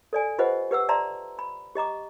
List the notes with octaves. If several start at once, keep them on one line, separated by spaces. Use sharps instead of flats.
A4 D5 G#5
F4 G4 B4 C5 D#5 F#5
G4 B4 F#5 E6
D5 E5 A5 A#5 C6
B5
G4 D#5 A#5 D6